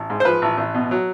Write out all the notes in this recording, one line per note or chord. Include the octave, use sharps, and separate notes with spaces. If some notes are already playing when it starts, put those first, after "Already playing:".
Already playing: A1
G#2
C5
F3 B4
A1
A1
B2
F#3